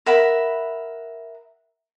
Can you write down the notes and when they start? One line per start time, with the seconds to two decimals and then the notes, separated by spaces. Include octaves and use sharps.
0.06 A#4 E5 F#5 B5